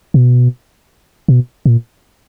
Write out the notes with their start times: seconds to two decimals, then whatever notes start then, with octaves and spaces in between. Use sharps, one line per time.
0.14 B2
1.28 B2
1.66 A#2